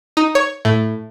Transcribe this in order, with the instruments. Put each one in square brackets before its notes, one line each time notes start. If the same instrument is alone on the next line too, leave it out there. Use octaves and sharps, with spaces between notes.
[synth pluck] D#4
C#5
A2